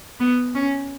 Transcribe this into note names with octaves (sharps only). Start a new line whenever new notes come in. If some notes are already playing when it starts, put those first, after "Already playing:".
B3
C#4